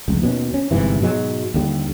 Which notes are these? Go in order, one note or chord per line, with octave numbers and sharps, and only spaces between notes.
F1 C#2
D#2 B2 C#4
C#4
G1 G#2 C3 E3
G#2 B2 F#3 G#3
D#2 D3 G3